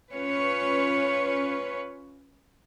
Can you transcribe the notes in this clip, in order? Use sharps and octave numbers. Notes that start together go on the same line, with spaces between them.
C#4 F4 B4 C#5